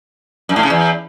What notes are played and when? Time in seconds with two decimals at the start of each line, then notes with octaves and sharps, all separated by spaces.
0.49 F#2
0.56 A2
0.63 C#3
0.70 E2